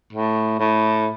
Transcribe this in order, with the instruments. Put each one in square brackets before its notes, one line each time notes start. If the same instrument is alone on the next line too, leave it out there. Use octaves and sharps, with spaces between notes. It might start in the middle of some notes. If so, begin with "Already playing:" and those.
[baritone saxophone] A2
A2